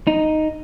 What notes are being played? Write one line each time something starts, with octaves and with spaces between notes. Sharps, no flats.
D#4